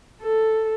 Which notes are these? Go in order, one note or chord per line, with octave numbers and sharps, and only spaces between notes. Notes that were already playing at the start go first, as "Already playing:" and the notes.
A4